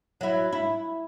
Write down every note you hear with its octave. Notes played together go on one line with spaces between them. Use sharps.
F#3 E4
E4